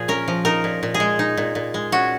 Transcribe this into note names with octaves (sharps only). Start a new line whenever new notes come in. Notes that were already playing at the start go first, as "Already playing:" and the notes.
Already playing: A#2 F3 G#4
C#4 A#4
F3
D#4 A#4
A#2
A#2
G#4
G#3
D#4
A#2
A#2
G#3
C#4 F#4